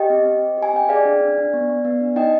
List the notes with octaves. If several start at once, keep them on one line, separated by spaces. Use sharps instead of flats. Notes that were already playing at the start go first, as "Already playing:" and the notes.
Already playing: G4 D#5 G5
C4
C4
C4
G4
G#5
C4 G5
G#4 D5 F5
D4
D4
D4
B3
B3
B3
D4
D#4 D#5 G5